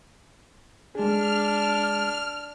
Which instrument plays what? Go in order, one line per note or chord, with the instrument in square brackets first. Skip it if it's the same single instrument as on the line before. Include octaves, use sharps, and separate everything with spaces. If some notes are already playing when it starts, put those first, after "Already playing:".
[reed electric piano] G#3 G#4 [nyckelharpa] D4 [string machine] F6